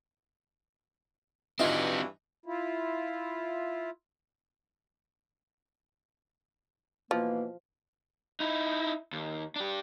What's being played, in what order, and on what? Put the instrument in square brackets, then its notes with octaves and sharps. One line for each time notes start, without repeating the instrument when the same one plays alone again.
[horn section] G2 E3 [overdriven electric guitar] C4 F#4 [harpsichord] D#4 [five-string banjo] F4 E5
[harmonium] E4 F4
[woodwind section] B2 E3 A#3 [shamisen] F3
[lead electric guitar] D#4 E4
D#2
D4 G4